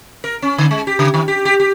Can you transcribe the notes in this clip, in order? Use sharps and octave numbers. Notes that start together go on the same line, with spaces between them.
A#4
C#4
D3
G#3
G4
C#3
D#3
G4
G4
G4